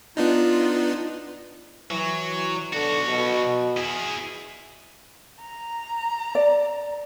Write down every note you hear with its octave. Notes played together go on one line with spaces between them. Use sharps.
B3 D4 D#4 F4
E3 F#3
B1 D3 F#4
B2
E4 G#4
A#5
D5